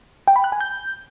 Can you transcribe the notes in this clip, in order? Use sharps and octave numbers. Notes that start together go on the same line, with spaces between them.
G5
B5
F#6
G#5
G6